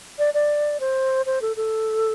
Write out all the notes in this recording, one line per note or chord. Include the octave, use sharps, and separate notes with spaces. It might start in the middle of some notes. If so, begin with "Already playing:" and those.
D5
D5
C5
C5
A4
A4